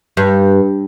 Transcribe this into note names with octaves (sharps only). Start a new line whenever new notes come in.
G2